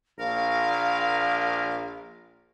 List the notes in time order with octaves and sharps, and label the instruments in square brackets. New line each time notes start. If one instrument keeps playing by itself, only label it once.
[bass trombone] A#1 [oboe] A#4 [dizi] F5